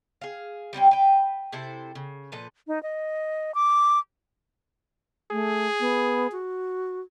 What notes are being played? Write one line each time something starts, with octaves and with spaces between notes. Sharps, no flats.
G#4 F5
G3 C4 C#4 G5
B4 G5
C3 E4 A4 C5
C#3
A#2 F3 A4 B4
D#4
D#5
D6
A3 G#4
B3
F#4